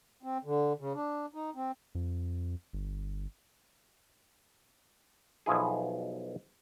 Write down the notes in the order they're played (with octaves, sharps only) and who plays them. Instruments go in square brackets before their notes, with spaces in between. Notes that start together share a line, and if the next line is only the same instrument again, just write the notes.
[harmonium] C4
D3
C#3
D4
D#4
C4
[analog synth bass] F2
G1
[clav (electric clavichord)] B1 B2 F3 E4 G#4